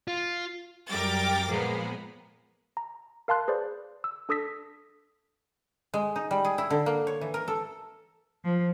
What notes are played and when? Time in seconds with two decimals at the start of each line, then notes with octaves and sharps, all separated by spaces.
0.08 F4
0.88 F#2 G3 A#4 G5 D6 A6
1.50 A#2 F3 G#3 A#3 B3
2.77 A#5
3.28 A#4 F5 A5 C6 F#6
3.48 G#4 B4 C5 D5
4.04 E6
4.29 D4 A4 D#6 E6 A#6 B6
5.94 G#3
6.16 D#4
6.31 G3
6.45 G#4
6.58 E4
6.70 D3
6.86 A#3
7.07 C#5
7.21 E3
7.34 A#4
7.48 A4
8.45 F3